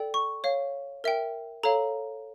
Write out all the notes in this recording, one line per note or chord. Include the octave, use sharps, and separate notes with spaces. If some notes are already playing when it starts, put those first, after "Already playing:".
Already playing: A4 D5 G5
C#6
C#5 F5
A#4 E5 G5
A4 C#5 F5 A#5